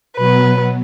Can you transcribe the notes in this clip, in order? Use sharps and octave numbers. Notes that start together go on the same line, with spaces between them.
B2 F#3 B3 B4